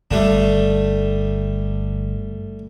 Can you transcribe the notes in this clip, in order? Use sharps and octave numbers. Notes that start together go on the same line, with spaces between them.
G1 G3 A3 D4